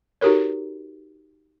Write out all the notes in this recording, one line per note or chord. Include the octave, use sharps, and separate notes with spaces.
D#4 F#4 G4 A4 A#4 C#5